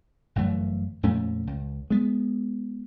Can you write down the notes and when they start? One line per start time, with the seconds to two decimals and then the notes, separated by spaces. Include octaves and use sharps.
0.36 G1 F#2 E3 A3
1.03 F2 A#2 A3 C#4
1.47 C#2
1.90 G#3 B3